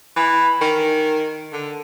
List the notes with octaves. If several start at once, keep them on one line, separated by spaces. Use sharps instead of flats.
E3
D#3
D3